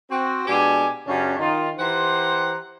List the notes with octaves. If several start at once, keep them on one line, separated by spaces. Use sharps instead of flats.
C4 F#4
B2 G#3 D4 G4 G#5
F#2 C#3 C#4 D4 G4 A5
D#3 D#4 F4
E3 G4 C5 F#5 A#5 C6